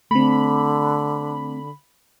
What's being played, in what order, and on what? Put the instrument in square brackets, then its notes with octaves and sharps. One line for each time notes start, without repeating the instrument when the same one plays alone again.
[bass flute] D3 [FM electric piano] A3 C4 [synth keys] B5